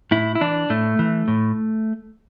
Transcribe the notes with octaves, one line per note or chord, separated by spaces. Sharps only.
A2 E4
E4
E3 D4
A2 A3
E3
A2